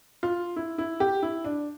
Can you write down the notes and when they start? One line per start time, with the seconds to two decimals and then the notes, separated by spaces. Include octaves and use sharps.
0.23 F4
0.56 E4
0.78 E4
1.00 G4
1.23 E4
1.45 D4